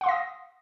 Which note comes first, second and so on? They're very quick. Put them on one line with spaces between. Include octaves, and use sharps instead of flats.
F#5 C6 F5 A#6 D#6